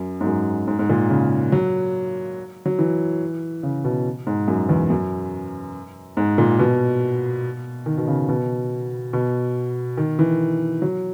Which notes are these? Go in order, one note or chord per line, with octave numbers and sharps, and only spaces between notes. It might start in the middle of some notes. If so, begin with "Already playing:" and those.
Already playing: F#2
G#2
F#2
G#2
G#2
A#2
C#3
F#3
F#3
E3
C#3
B2
G#2
F#2
E2
F#2
G#2
A#2
B2
D#3
B2
C#3
B2
B2
D#3
E3
F#3